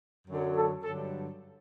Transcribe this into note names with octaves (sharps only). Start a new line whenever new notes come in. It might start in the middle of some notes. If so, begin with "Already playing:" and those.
F#2 D3 F#3
A4
G2 D3 F#3 A4